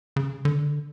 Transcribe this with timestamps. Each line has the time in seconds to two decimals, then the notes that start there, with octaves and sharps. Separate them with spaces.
0.16 C#3
0.45 D3